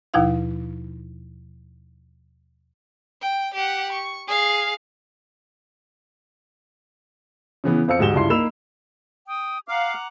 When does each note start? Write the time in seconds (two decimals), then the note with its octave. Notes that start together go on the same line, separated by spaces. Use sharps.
0.14 D#2 B2 F3 D#4 E4 F5
3.22 G5
3.54 G4 F#5
3.92 C#6
4.27 G#4 F5
7.64 C#3 E3 B3
7.88 F2 C5 F5 E6 C#7
7.99 D2 G#2 G4 E7 G7
8.14 C#2 G2 E4 C6 C7
8.30 A#3 D#4 B5 E6 E7 F7
9.27 G5 D#6
9.68 F5 F#5 A#5 D6